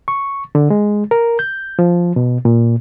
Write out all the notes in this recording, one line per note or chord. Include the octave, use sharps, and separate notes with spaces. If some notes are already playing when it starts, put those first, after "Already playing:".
C#6
D3
G#3
A#4
G6
F3
B2
A#2